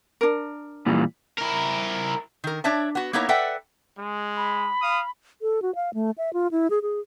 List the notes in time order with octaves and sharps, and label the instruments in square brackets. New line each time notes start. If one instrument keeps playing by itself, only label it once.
[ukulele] D4 A#4
[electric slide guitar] A#2 E3 G3
[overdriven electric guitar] E4 A#4
[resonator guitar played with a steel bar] D#3 A#4
D4 C#5 D5 E5 A5
B3 F#4
A#3 B3 D#4 E4 A#4 C#5
A4 B4 D5 E5 F#5 G5
[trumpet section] G#3
[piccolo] B5
[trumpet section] F5 D#6
[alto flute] A4
F#4
F5
A3
E5
F4
E4
G#4
G#4